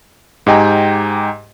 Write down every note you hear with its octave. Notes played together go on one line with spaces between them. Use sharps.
G#2 G4 D#5 G5 G#5 A#5